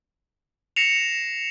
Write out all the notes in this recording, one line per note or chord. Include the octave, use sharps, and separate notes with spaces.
A#6 C7 C#7 E7 F7